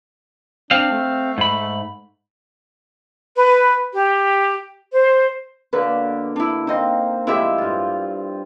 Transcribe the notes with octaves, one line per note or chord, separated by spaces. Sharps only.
C4 D4 F5
A3
G#2 B5
B4
G4
C5
B2 D3 A#3 B4
D4 E4
A#3 C4 D#4 D#5
A2 F3 G#3 E4 G4 E5
G2 F4